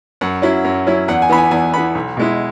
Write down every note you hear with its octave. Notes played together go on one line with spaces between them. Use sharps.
F#2 F#5
F#3 C#4 E4
F#2
F#3 C#4 E4
E2 F#5
G#5
E3 B3 B5
G#5
E2 G#5
E3 B3 B5
B1
B2 G#3 E4